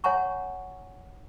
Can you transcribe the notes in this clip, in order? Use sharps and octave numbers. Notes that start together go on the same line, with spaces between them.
C#5 F#5 G#5 A#5 C#6